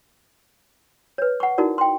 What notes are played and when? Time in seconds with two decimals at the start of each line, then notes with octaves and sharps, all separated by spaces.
1.18 B4 C#5
1.40 F#5 C#6
1.58 D#4 E4 F#4 A#4 D5
1.78 G5 C6